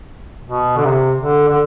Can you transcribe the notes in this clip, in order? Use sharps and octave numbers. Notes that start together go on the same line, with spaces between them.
B2
D3
C3
D3
D3